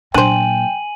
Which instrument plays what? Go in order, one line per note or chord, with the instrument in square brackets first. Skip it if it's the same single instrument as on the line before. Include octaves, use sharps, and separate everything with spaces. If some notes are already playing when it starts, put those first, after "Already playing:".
[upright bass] A#2 F#3 [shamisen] D4 C5 [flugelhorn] G5 [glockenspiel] G#5 D#7 F#7